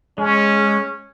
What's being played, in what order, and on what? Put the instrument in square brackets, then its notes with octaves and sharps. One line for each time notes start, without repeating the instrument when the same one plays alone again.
[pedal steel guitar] G#3 [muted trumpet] C#4